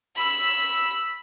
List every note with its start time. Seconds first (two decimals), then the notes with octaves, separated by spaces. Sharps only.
0.16 B5 E6